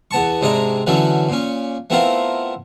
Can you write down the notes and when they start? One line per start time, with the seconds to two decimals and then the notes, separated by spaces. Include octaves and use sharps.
0.11 E2 B3 A5 C#6
0.41 G#2 C3 D4 D#5 G#5 A#5
0.87 D3 E3 F#3 A3 C#4
1.29 A#2 C#4
1.90 A3 B3 C4 E4 F4 A#4